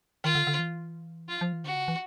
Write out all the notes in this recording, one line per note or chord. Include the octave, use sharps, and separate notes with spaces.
D#3 F4
D3
D3
E3
F3 F4
F3
E3
D3 F#4
C#3
E3